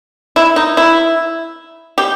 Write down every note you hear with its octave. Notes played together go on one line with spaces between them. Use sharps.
E4
D#4
E4
G4